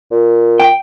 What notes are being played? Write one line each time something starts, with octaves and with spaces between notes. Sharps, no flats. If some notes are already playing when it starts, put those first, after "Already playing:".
A#2
G5